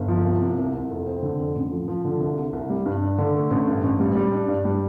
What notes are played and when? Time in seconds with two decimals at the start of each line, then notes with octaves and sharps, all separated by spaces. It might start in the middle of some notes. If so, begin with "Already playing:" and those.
Already playing: G1
0.08 F3
0.25 C2
0.41 C3
0.58 C2
0.74 C2
0.90 F2
1.06 C4
1.23 D3
1.40 F2
1.56 A1
1.72 F3
1.88 F3
2.05 D3
2.20 C2
2.37 C3
2.53 C2
2.70 G3
2.86 G2
3.02 D4
3.18 D3
3.34 A3
3.51 A1
3.67 G2
3.83 A1
4.00 G3
4.15 G3
4.32 D4
4.48 G2
4.65 G3